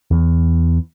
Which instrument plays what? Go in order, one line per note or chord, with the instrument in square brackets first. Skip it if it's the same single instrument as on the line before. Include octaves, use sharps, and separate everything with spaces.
[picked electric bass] E2